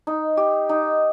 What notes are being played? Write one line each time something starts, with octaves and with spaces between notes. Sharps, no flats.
D#4
G4
D#4